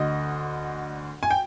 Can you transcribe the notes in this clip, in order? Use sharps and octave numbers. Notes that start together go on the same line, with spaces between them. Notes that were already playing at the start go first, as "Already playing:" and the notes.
Already playing: D2 D3 D#5
G#5
G5